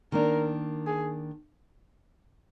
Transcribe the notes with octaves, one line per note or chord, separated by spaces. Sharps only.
D#3 A#3 D4 A#4
G#4